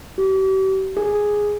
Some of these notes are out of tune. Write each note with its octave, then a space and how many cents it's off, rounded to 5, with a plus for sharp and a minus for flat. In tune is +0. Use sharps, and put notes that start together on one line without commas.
G4 -40
G#4 +0